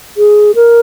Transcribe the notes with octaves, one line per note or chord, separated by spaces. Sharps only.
G#4
A#4